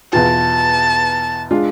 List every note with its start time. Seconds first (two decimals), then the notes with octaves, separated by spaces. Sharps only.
0.13 E2 B2 B3 F4 A5
1.51 G#3 D4 F4